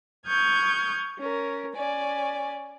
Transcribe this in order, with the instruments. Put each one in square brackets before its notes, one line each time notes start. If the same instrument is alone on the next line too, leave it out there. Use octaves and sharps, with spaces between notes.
[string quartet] C#6 D#6 F6 G6 G#6
C#4 A#4
C#4 D5 G#5